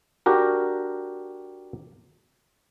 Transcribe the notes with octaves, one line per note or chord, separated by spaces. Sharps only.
D4 F#4 G4 A#4